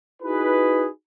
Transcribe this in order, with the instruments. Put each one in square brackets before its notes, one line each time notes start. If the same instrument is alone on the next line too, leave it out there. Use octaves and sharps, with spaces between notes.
[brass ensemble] D#4 E4 F#4 G#4 B4